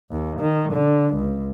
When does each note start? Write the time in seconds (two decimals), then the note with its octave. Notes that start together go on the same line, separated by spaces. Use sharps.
0.11 D#2
0.40 D#3
0.72 D3
1.15 C#2